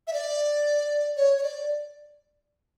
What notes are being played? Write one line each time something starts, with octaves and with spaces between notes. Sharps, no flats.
E5
D5
C#5
C#5
D5